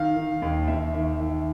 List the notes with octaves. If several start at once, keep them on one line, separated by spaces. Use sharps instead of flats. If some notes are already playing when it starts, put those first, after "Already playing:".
Already playing: D#3 F5
D#3
D#2
D#2 E5
D#3 E5
D#3 E5